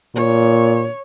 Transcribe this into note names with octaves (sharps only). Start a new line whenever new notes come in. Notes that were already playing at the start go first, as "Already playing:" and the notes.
A#2 C#5